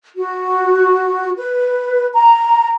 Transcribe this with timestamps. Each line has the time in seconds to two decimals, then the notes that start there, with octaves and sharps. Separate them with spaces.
0.16 F#4
1.37 B4
2.13 A#5